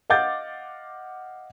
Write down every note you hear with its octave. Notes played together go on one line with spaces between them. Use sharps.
D#5 F5 F#5 D6 G6 A6